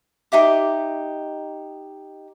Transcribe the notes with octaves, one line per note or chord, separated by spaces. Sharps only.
D#4 G4 E5 D6